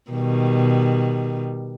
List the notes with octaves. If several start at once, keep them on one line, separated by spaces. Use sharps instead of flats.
B2 D#3 G3